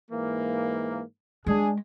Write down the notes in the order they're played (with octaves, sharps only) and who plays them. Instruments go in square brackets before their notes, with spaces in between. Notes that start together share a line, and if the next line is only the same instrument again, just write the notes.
[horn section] G#2 E3 A#3
[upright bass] G#3 [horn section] D4 G#4